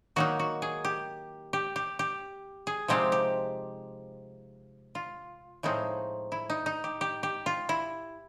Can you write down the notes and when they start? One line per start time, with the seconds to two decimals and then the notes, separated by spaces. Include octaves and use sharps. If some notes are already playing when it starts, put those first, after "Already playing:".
0.16 D#3 F#3 A#3 D#4 F#4
0.39 F#4
0.62 G#4
0.85 G4
1.53 G4
1.76 G4
1.99 G4
2.67 G#4
2.88 C3 F3 G#3 C4 D#4 G4
3.12 G4
4.95 F4
5.63 A2 F3 G#3 C4 D#4
6.32 E4
6.50 D#4
6.66 D#4
6.84 G4
7.01 G4
7.23 G4
7.46 F4
7.69 E4